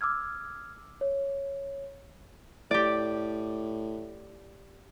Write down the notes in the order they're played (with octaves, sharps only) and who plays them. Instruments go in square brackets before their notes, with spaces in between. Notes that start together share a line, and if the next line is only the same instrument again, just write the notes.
[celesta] D6 E6 F6 G#6
C#5
[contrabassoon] A2 [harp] G4 D5